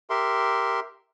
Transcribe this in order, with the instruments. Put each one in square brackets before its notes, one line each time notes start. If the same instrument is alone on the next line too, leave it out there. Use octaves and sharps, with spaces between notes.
[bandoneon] G4 A#4 E5 C6